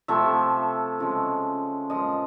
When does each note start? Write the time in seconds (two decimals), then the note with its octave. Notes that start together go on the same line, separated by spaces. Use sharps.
0.08 C3 F3 A3 E5
0.99 C#3 F3 G#3
1.90 A#2 F3 G#3 D#5